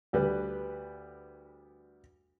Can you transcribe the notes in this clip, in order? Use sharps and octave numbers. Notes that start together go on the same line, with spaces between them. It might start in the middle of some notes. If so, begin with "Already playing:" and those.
D2 G3 B4